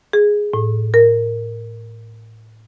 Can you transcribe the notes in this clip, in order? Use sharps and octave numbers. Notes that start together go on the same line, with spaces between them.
G#4
A2
A#4